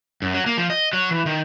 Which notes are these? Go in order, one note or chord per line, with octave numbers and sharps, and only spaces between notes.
F#2
F#3
A#3
F3
D#5
F#3
E3
D#3